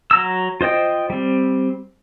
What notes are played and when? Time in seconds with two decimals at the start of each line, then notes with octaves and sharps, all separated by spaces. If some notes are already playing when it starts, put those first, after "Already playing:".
0.11 F#3 A#5 E6
0.61 F4 C5 D#5 G5
1.10 G3 C4